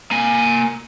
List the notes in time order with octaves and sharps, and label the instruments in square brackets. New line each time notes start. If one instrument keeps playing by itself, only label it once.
[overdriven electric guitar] A#3 G#5